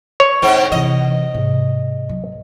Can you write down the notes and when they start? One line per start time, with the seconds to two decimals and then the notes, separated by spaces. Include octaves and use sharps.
0.20 C#5
0.42 G#2 D3 C4
0.72 C3 E3 D#5
1.34 G#2 C3
2.09 F#3